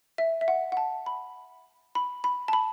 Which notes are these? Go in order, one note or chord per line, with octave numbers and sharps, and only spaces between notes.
E5
E5
F#5
F#5
A5
B5
B5
B5
A5
B5